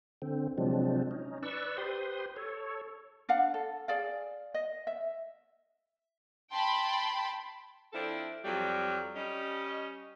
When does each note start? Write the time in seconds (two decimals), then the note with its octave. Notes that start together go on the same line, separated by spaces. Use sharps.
0.22 D3 C4
0.58 C3 F3 F#3 G#3 C4 D4
1.11 C#4 D#4
1.43 B4 D5 C#6 E6
1.78 G4 B4 C5 C6 D#6
2.36 A4 C#5
3.29 D4 F5 F#5
3.54 A4
3.88 G#4 D5 F5
4.54 D#5
4.87 E5
6.52 G5 A5 B5 C6
7.93 F3 C4 D4 E4 A4 D5
8.45 F2 F#3 G3
9.16 G3 C#4 D#5